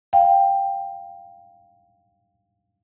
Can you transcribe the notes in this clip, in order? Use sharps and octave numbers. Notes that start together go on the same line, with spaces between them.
F5 G5